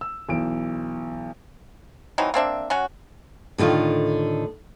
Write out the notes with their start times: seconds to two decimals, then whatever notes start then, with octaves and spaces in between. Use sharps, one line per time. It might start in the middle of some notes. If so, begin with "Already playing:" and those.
0.01 E6
0.29 B1 E3 D7
2.18 E3 F#3 C4 D#4
2.34 A#3 C4 D4 E5
2.70 F#3 C#4 F#4
3.58 A2 D3 D#3 F4